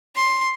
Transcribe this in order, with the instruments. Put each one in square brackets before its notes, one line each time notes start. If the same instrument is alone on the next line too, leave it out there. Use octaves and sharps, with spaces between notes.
[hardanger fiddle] C6